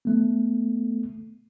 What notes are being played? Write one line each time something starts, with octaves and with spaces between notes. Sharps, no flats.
A3 B3